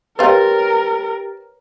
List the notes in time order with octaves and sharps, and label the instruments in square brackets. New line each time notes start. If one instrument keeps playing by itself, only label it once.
[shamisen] C4 F4 [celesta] G4 G5 A6 [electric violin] A#4 [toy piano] B4 C#5